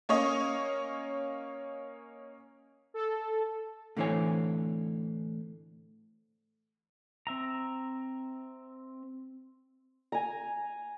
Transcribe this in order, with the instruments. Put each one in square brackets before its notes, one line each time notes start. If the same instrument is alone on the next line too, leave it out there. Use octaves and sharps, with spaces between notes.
[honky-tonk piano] A#3 C#4 C#5 D#5
[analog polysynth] A4
[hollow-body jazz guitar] A2 D3 E3 C4 C#5 G#5
[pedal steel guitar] C4 E5 A#5
[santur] G#5 A#5